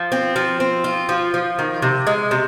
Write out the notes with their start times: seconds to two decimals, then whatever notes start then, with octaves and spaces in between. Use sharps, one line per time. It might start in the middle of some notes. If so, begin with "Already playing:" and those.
Already playing: F3
0.12 C4
0.36 F3
0.60 C4
0.84 F4
1.09 F3
1.34 F3
1.59 D#3
1.82 C3
2.07 G#3
2.31 C3